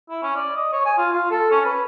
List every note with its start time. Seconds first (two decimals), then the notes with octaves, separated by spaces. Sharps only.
0.10 E4
0.23 C#4
0.36 D5
0.56 D#5
0.73 C#5
0.85 G#5
0.98 F4
1.12 F4
1.31 A4
1.51 C#4
1.65 B4